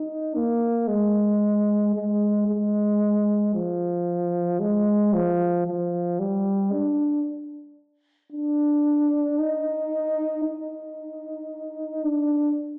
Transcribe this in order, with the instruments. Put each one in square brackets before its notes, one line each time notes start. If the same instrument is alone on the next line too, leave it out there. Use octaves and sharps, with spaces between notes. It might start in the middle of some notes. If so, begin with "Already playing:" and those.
Already playing: [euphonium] D#4
A#3
G#3
G#3
G#3
F3
G#3
F3
F3
G3
D4
D4
D#4
D#4
D4